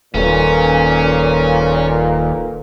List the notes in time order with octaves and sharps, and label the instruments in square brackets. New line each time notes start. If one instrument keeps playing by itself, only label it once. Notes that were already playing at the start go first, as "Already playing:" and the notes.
[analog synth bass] D#1 [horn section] A#2 [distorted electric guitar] C#4 [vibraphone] A4 B4